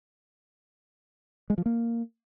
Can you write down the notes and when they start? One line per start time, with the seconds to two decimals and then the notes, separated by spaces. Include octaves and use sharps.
1.50 G#3
1.58 F3
1.66 A#3